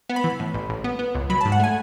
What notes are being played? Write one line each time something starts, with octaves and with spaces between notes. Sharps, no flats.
B3
B5
E3
A2
A1
A1
B3
B3
C#2
F#3 B5
G#2 A5
F#5
A3 G#5